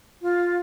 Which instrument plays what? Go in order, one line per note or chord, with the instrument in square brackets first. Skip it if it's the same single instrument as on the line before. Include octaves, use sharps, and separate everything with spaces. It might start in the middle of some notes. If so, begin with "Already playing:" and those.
[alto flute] F4